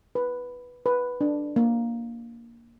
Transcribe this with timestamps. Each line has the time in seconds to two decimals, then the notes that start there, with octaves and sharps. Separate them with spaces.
0.15 B4
0.86 B4
1.21 D4
1.56 A#3